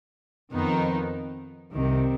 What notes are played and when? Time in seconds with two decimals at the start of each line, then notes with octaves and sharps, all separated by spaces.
0.53 F2 D#3 B3 D#4
1.72 C2 C3 D#3